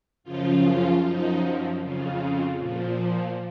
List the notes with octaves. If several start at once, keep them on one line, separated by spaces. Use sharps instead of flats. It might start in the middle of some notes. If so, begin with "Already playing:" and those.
F#2 C#3 F3 F4
F#2 F3 D#4
F2 C#3 F3
A#2 F3